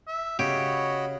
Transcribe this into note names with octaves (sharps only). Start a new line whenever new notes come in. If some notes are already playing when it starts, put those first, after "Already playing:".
E5
C#3 F#4 G4 C#5 D#5 B5